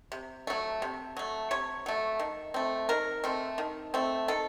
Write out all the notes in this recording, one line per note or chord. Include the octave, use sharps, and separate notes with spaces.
C3
F#3 A3
C3
F#3 A3
C3 C#5
F#3 A3
D#3
A3 C4
D#3 A#4
A3 C4
D#3
A3 C4
D#3 A4